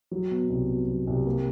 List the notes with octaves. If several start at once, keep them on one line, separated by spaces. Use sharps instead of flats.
F#3
B2
C2
B2
F#3
C2
A#3